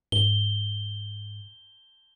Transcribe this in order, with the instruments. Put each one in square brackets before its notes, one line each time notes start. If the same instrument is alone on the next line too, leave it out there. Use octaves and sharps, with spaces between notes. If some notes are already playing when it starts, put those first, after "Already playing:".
[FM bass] G#2 [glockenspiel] G7